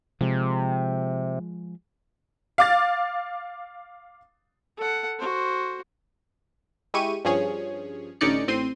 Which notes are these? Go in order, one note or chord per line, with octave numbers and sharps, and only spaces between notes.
C3 F3 G#3
F5 D6 A6
A4 F#5
F#4 C5
G#3 E4 G4 C#6 D#7
G2 F3 C#4 G#4 C#5
A1 D3 C#4 D#4 D5 C#7
A1 C4 C6 D#7